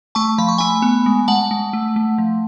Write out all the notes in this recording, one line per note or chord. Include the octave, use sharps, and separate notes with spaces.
A3 A5 C#6
F3 B5
C#6
A3 G#5 B5
B3
G#3
G#3 F#5 A5
G#3
A3
A3
F3